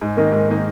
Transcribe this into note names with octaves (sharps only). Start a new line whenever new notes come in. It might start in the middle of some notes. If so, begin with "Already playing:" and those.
G#2
D#3 A#3 D#4
G#2
D#3 A#3 D#4